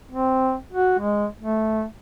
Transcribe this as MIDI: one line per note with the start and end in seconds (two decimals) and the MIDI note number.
0.12 0.56 60
0.73 0.95 66
0.99 1.26 56
1.39 1.84 57